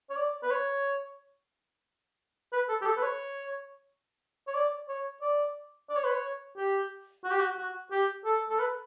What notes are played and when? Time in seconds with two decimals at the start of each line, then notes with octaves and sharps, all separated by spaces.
0.10 C#5
0.16 D5
0.43 B4
0.51 C#5
2.53 B4
2.69 A4
2.81 G4
2.86 A4
2.97 B4
3.03 C#5
4.48 C#5
4.54 D5
4.88 C#5
5.22 D5
5.89 D5
5.96 C#5
6.04 B4
6.12 C#5
6.57 G4
7.24 F#4
7.31 G4
7.40 F#4
7.57 F#4
7.91 G4
8.25 A4
8.49 A4
8.59 B4